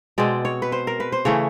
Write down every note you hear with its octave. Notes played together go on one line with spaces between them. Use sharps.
B2 G#3 C4 D5
C#5
B4
C5
A#4
B4
C5
C#3 E3 A3 C#5